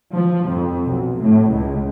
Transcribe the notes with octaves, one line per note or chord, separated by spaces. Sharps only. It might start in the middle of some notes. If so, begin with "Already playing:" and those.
F3
F2
B1
A2
C#2